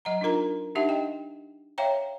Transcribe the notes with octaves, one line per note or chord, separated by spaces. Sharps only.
F#3 D#5 F#5 A#5
D4 D#4 F4 A#4 A#5
D4 D#4 G4 E5 F#5 A5
D#5 G5
C#5 E5 F5 G5 A#5